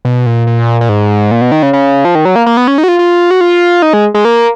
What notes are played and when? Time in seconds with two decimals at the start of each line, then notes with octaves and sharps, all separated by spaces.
0.05 B2
0.26 A#2
0.47 A#2
0.81 A#2
0.89 G#2
1.31 A#2
1.41 B2
1.52 D#3
1.63 C#3
1.73 C#3
2.05 F3
2.15 D#3
2.25 F#3
2.36 A#3
2.46 A#3
2.57 B3
2.68 C#4
2.78 D#4
2.84 F#4
2.88 F4
2.99 F4
3.31 F#4
3.41 F4
3.82 D#4
3.93 G#3
4.14 G#3
4.25 A#3